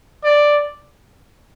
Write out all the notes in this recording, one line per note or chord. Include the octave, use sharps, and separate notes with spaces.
D5